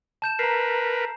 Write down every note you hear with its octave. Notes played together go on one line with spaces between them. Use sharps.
A5 G6 E7
A#4 B4 A#5 C7